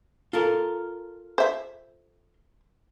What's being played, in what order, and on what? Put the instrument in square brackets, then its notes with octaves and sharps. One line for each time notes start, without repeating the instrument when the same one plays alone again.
[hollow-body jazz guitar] F4 A4 A#4
[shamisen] C5 E5